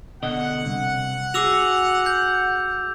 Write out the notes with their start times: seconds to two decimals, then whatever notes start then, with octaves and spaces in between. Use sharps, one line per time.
0.23 B2 D3 D#5 F#5
0.66 C2
1.34 F#4 G#4 D6 E6 F7
2.06 G6